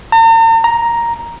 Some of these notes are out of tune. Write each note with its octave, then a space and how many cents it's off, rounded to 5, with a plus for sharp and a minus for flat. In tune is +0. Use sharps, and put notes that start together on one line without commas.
A#5 -45
A#5 +5